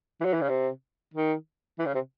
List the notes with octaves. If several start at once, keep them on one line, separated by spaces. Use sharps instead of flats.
E3
F#3
E3
C#3
C3
D#3
E3
C#3
C3